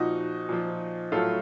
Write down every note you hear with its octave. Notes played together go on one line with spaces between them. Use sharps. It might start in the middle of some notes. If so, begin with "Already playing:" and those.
Already playing: A#2 F3 D#4 F#4
A#2 F3
A2 F#3 F4 A4